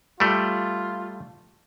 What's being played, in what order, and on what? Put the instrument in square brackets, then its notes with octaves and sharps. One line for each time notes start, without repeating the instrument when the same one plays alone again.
[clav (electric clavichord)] G3 A3 [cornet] F4